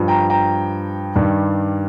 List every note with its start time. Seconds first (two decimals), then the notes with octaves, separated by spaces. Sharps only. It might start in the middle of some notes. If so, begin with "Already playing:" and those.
Already playing: G2 F3
0.08 G5 A#5
0.30 G5 A#5
1.15 G2 D#3 G3